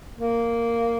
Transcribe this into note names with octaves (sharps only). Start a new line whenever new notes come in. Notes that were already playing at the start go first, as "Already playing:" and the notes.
A#3